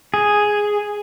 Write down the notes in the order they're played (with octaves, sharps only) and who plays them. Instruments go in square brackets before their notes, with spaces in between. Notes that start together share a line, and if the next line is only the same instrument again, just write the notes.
[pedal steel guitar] G#4